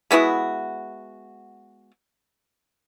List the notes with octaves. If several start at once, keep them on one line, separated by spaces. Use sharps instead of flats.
G#3 B3 E4 F#4